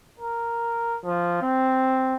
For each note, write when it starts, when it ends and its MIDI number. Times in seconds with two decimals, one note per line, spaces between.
0.20 0.97 70
1.05 1.42 53
1.42 2.15 60